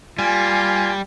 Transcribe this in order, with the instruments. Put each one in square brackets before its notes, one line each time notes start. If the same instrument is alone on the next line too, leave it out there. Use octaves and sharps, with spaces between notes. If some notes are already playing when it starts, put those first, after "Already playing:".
[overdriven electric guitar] G3 [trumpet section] A#3 F4 [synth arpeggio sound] G#5